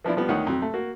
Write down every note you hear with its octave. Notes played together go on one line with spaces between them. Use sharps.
E3 F3 B3 D4 E4
F3 G3 B3
D2 D#3 C#5 F#5
F2 F#3
A3
A#3 F#4